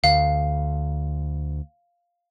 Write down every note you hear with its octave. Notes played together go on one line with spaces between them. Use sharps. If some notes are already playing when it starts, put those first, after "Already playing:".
D2 F5